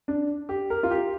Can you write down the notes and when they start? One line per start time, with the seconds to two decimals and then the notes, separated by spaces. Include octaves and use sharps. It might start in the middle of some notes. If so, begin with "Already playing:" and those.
0.08 D4
0.49 G4
0.70 A#4
0.83 F4
0.91 G4